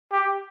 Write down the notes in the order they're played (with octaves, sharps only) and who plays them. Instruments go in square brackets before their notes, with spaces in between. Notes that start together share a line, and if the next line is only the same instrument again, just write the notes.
[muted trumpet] G4